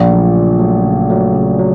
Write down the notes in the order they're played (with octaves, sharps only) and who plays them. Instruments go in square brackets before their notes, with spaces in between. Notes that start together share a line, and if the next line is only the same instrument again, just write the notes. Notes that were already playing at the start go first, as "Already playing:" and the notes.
Already playing: [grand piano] A#1 A#2 [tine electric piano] C#3
[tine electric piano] F#3 A3
C#3
F#3 A3
C#3
F#3 A3
C#3
F#3